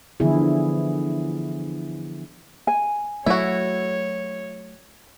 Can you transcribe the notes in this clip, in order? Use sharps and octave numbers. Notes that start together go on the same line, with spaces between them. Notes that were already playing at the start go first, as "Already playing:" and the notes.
D3 E3 F3 B3 E4 G#4
G#5
F#3 A3 E4 F#4 C#5